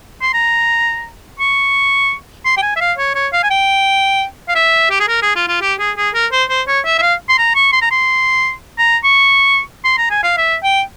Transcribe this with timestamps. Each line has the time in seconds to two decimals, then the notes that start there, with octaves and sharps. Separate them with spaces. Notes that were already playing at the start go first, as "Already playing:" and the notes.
0.22 C6
0.34 A#5
1.39 C#6
2.45 C6
2.57 G5
2.62 G#5
2.76 E5
2.80 F5
2.98 C#5
3.15 C#5
3.33 F5
3.43 G#5
3.50 G5
4.49 F5
4.55 E5
4.90 G4
5.00 G#4
5.08 A#4
5.22 G#4
5.36 F4
5.48 F4
5.62 G4
5.79 G#4
5.97 G#4
6.14 A#4
6.32 C5
6.50 C5
6.67 C#5
6.85 E5
6.98 E5
7.02 F5
7.29 C6
7.38 A#5
7.55 C#6
7.72 C6
7.82 A#5
7.91 C6
8.79 A#5
9.04 C#6
9.84 C6
9.98 A#5
10.10 G#5
10.23 F5
10.37 E5
10.64 G5